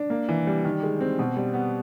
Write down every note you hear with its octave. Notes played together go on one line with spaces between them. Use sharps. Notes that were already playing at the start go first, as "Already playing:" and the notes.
Already playing: D4
A#3
E3
G3
D#3
G#3
C4
B2
G3
B3